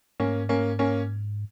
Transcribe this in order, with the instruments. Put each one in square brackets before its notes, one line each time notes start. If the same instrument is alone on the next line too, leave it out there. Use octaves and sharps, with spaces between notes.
[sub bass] G#2 [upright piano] A#3 C#4
[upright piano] A#3 C#4
A#3 C#4